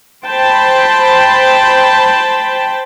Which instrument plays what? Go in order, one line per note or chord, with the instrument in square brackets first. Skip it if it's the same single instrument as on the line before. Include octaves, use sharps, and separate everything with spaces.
[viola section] C5 G5 A5 B5